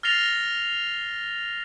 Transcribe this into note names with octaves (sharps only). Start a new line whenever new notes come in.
F6 A6 A#6 C7 F7 G7